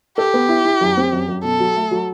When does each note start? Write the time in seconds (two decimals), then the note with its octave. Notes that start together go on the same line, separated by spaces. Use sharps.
0.18 G4 A4
0.34 B3
0.49 E4
0.65 E4
0.81 F#2
0.97 C4
1.13 F#2
1.29 F#2
1.43 B2 A4
1.60 F#3
1.76 A3
1.91 F#3